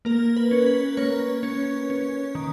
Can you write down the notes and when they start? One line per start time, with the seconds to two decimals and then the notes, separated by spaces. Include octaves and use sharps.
0.05 A#3 A#4
0.36 B4
0.51 C#4
0.66 B4
0.97 A#3 C#5
1.43 C#4
1.90 C#4
2.35 D#3